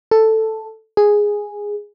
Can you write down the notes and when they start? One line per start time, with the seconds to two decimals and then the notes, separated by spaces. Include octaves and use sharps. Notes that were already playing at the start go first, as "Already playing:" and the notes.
0.11 A4
0.97 G#4